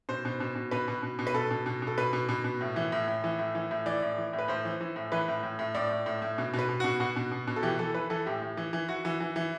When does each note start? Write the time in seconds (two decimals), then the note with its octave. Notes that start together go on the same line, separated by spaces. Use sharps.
0.09 B2 C5
0.25 B2
0.40 B2
0.55 B2
0.71 B2 B4
0.88 B2
1.03 B2
1.19 B2
1.27 B4
1.34 B2 A4
1.51 B2
1.66 B2
1.82 B2 A4
1.98 B2 B4
2.13 B2
2.29 B2
2.44 B2
2.61 A2
2.76 E3
2.92 A2
3.08 A2
3.24 E3
3.39 A2
3.55 E3
3.71 A2
3.86 E3 D5
4.02 A2
4.18 E3
4.33 A2
4.39 B4
4.48 A2 C5
4.65 E3
4.81 E3
4.96 A2
5.12 E3 B4
5.28 A2
5.43 A2
5.59 A2
5.74 A2 D5
5.90 A2
6.06 A2
6.22 A2
6.38 B2
6.54 B2
6.59 B4
6.69 B2
6.80 B2 F#4
7.00 B2 F#4
7.16 B2
7.32 B2
7.47 B2
7.56 A4
7.63 E3 G4
7.79 E3 A4
7.94 E3 B4
8.10 E3 A4
8.26 A2 G4
8.42 A2
8.57 E3
8.73 E3
8.88 E3 F#4
9.05 E3
9.20 E3
9.36 E3